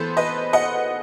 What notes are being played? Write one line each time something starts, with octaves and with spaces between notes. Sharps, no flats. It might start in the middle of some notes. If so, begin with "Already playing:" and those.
Already playing: E3 B3 A4 C5
B4 D#5
D#5 F#5